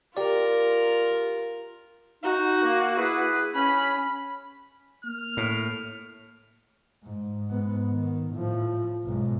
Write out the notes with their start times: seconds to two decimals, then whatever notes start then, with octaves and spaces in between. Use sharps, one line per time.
0.17 F4 G4 A#4 D5
2.24 D#4 F#4
2.62 A#3
2.97 E4 G#4 B4
3.55 C#4 B5
5.04 A#3 F6
5.37 A2
7.04 G#2
7.50 G#2 B3
7.92 D#3
8.34 A2 F3
9.04 B1 G#2